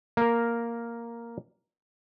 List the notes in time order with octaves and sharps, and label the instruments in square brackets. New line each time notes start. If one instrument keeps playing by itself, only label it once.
[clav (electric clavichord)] A#3 A#4